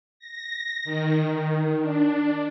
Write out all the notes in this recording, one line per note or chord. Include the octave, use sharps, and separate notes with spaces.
A#6
D#3
D4